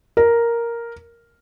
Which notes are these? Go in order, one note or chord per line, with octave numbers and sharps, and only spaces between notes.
A#4